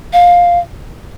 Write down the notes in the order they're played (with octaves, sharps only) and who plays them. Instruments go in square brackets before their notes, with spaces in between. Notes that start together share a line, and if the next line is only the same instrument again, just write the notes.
[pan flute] F5